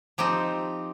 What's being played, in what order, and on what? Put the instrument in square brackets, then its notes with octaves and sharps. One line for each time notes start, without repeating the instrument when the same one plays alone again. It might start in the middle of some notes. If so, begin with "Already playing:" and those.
[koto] F3 C4 D#4 G4